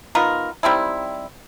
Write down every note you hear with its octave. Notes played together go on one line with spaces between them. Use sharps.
B3 D#4 F4 A#4
G3 C4 D#4 E4